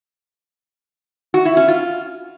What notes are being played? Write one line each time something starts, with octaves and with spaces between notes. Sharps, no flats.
F#4
E4
C#4
F4